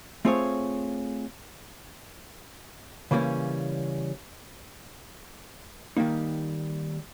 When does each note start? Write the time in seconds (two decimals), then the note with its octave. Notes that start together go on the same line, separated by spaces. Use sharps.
0.25 A3 C4 F4 G#4 C#5
3.11 C#3 E3 G3 A#3 C#4
5.97 D#3 G3 A#3 D#4